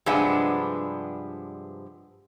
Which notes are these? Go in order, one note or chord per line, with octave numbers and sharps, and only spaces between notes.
G2 C3 F3 G#3 B3 D4